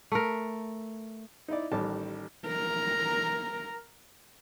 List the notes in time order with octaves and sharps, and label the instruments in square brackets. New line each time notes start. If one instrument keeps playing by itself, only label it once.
[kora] A3 A#4
[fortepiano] D#4 E4 D5
A1 D#3 G3 G4 A5
[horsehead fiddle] A#4 A#5